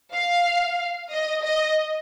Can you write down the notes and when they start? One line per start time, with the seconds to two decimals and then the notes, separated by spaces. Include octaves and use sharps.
0.13 F5
1.11 D#5
1.43 D#5